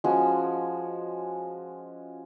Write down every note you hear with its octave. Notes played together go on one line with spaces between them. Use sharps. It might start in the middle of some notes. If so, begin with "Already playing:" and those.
F3 G#3 C#4 F#4